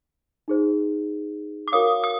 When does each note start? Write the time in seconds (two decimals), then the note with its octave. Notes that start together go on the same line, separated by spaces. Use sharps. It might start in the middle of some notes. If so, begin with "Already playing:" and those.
0.48 D#4 G#4 C5
1.68 D6
1.72 F#4 A#4 C#5 F5 D#6
2.04 D#6